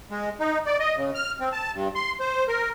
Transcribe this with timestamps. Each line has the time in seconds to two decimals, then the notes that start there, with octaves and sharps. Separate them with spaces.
0.11 G#3
0.40 D#4
0.66 D5
0.79 D#5
0.97 C#3
1.15 F6
1.40 C4
1.53 A5
1.74 G2
1.95 C6
2.20 C5
2.48 A#4